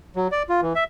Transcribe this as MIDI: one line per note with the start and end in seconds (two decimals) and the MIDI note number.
0.16 0.28 54
0.32 0.43 74
0.49 0.61 65
0.62 0.73 52
0.75 0.84 76